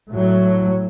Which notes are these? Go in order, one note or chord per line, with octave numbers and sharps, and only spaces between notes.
A2 F#3